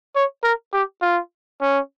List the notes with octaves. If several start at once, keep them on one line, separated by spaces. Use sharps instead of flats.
C#5
A#4
G4
F4
C#4